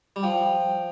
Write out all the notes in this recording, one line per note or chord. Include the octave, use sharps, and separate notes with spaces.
G3
F3 G5